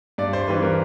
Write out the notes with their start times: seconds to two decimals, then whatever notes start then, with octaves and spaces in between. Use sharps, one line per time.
0.18 G2 D5
0.33 C5
0.48 E3 G3 C4 B4
0.63 A#4